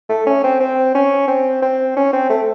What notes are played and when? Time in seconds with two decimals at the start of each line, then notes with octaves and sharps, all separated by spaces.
0.09 A3
0.26 C#4
0.44 C4
0.60 C4
0.95 C#4
1.28 C4
1.62 C4
1.97 C#4
2.13 C4
2.30 A3